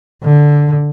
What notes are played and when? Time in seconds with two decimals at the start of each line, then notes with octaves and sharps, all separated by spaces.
0.24 D3